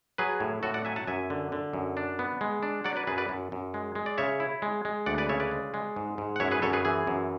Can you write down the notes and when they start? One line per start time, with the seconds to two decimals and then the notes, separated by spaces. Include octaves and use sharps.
0.18 F#3 G#4 B4
0.40 A2
0.63 A2 F#4 A4
0.74 D5 F#5
0.85 F#3 E5 G#5
0.96 F#5 A5
1.07 F#2 E5 G#5
1.30 D3
1.52 D3
1.73 F#2
1.97 D4
2.19 B3
2.41 G#3
2.63 D4
2.84 F#3 D5 F#5
2.96 B4 D5
3.07 F#2 G#4 B4
3.18 B4 D5
3.29 F#2
3.52 F#2
3.74 G#3
3.95 G#3
4.06 D5
4.18 C#3 C#5 E5
4.40 E4
4.62 G#3
4.85 G#3
5.06 D2 D5 F#5
5.18 B4 D5
5.29 C#3 C#5 E5
5.40 B4 D5
5.51 G#3
5.74 G#3
5.96 G#2
6.18 G#2
6.36 F#5
6.40 F#2 C#5 E5
6.51 G#4 B4
6.62 F#2 A4 C#5
6.73 G#4 B4
6.85 E3 G#4
7.07 F#2